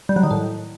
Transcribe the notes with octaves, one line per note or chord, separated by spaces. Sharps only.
G3
F#3
D#3
A2